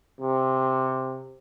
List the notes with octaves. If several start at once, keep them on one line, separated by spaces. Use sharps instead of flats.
C3